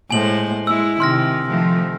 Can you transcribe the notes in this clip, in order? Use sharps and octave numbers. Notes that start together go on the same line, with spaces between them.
A2 G#3 C5 G#5 F#7
G#3 E4 E6
C3 D#3 C6 F6 A#6
D#3 F3 A3